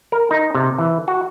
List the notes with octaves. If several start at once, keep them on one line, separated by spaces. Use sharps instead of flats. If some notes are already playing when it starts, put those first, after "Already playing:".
A#4
D#4
C3
E3
F#4